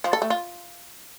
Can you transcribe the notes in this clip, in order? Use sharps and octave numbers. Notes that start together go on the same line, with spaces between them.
F3
A4
A3
F4